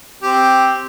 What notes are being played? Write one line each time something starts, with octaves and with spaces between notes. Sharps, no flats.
C4 G4